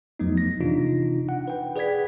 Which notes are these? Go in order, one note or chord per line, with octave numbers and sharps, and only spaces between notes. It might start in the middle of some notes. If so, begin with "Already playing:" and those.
F2 F3 F#3 A3 B3 D#4
A#6
C3 E3 D4 D#4 F4
F#5
B4 G5
G#4 B4 D5 F#5 G#6 B6